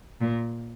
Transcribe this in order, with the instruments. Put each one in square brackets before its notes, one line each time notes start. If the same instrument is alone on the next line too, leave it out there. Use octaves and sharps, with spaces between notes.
[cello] A#2